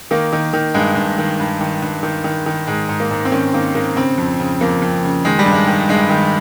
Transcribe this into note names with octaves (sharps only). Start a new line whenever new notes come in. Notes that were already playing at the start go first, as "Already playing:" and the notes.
D#3 A#3
D#3
D#3
G2 G#3
G2
D#3
G2
D#3
G2
D#3
D#3
D#3
G#2 G#3
G#2
A#3
G#2
C4
D#3 C#4
D#3 A#3
G#2 A#3
C#3 C4
F2
C#3
F2 A#3
F2
C#3
D#3 G#3
G3
G2
G#3
D#3
G2 G#3
D#3